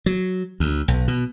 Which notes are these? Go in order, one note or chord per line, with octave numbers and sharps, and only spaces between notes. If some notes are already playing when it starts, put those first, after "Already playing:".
F#3
D2
B1
B2